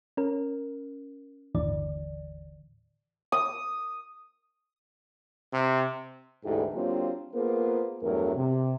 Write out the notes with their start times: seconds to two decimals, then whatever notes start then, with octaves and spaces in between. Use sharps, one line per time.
0.17 C#4 A#4
1.55 G1 D#2 A2 D3 E3 D5
3.32 D#6
5.53 C3
6.45 D2 G#2 E3 E4 G4 A4
6.75 F#3 A#3 C4 D4 F4 G4
7.34 A#3 B3 F4 G#4 A#4 C5
8.03 E2 G2 F#3 A3 A#4
8.36 C3